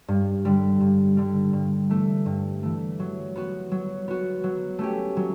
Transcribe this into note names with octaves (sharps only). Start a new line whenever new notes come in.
G2
D3 G3
G2
D3 G3
G2
E3 A3
G2
E3 A3
F#3
B3 F#4
F#3
B3 F#4
F#3
A3 C#4 G4
F#3